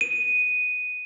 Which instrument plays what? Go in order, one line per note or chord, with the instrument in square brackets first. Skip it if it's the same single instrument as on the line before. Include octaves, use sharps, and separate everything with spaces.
[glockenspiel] D#7